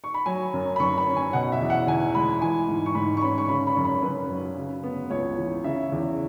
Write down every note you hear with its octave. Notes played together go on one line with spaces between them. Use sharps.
C#6
B5
F#3 G#5
F#2
B5
F#2 C#6
B5
C#4
G#5
B2 F#5
E5
E2
F#5
E2 G#5
G#3 B5
E3 G#5
G#2
C#6
G#2 B5
C#6
C#4 B5
C#6
C#3 B5
B5
F#2
B5
F#2 B4
F#3
C#3
B3
C#2 C#5
E3
C#3 E5
E2